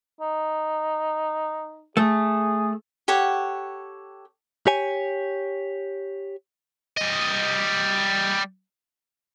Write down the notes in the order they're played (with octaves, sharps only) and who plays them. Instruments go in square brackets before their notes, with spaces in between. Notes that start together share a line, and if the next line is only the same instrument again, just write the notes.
[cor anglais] D#4
[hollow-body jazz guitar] A3 [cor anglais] G#4
[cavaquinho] G4 A4 C#5 F#5
[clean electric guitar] G4 C#5 G#5
[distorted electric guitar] G3 D#5